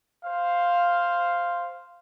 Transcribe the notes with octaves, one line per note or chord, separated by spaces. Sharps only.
C5 F5